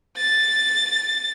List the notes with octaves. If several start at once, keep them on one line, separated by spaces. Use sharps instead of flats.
A6